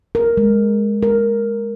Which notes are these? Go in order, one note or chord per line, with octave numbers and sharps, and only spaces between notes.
A#4
G#3
A#4